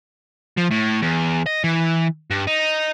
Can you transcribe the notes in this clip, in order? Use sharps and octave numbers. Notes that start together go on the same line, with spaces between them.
F3
A2
E2
D#5
E3
G2
D#4